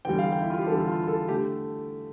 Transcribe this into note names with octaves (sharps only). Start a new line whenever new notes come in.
E2 D3 G3 G5
F5
G5
E4
F4
G4
E2 D3 G3 A4
F4
A4
D3 A3 G4